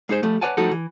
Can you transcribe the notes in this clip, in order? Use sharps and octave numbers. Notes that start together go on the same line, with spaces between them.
G#3 D#4 G#4 C5
F3 G3 A3
B4 C#5 D5 F#5 G#5 A5
F3 G3 A3 D#4 F#4 A4
E3